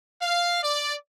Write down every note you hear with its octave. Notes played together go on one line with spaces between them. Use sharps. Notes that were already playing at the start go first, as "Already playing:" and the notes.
F5
D5